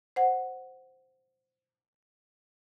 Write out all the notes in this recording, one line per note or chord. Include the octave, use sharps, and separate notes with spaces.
C5 F#5